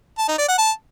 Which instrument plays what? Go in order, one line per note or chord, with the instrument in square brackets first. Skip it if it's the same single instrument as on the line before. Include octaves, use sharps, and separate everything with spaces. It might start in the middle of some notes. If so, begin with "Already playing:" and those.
[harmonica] A5
D#4
D5
F#5
A5